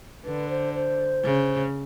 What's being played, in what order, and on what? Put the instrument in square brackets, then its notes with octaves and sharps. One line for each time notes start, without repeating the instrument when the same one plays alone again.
[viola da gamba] D3 [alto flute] B4
[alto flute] C5
C5
[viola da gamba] C#3